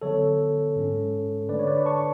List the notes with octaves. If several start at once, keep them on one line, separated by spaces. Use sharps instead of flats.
D3 F#3 B3 A4 C#5
G#2 G#3 C#4
D3 A3 D4 B4 D5
C#5
B4 D5
A5 C#6